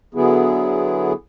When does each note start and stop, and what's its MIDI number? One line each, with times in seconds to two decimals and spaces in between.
0.14 1.13 50
0.14 1.13 54
0.14 1.13 59
0.14 1.13 64
0.14 1.13 68